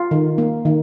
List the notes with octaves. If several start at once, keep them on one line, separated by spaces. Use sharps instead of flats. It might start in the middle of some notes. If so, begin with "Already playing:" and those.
Already playing: F4
D#3
A#3
D#3